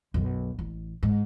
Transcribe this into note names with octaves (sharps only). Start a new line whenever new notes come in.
B1 F#2
A1
G#2